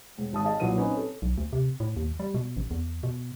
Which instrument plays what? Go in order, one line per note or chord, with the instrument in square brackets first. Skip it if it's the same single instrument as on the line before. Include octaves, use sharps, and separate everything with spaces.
[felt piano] E1
G#1 A5 D#6
G#4 D#5 F5 A5
B1 A#2 F#3 E4 B4 D#7
C4 C#4 D#4 B4 C#5
A4
[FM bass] B1
D2
C3
A2
D#2
G3
B2
A1
E2
B2